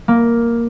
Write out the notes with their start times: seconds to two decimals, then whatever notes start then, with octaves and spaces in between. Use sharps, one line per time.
0.08 A#3